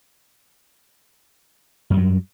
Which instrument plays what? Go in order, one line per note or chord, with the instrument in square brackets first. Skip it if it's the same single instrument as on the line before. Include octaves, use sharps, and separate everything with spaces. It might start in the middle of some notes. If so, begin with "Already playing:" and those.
[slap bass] F#2
G3
F#3